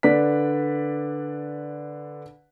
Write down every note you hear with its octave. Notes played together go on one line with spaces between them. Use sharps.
D3 B4 D5 B6